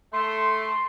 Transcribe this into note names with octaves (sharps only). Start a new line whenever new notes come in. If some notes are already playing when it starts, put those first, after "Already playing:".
A3 C6